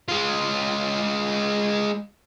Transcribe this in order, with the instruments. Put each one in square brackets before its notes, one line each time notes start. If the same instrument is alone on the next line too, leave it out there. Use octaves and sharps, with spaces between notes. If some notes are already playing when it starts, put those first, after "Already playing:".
[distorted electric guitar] G#3 F4